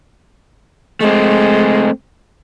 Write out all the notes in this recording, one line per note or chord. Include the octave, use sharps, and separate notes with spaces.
G#3 A3 C4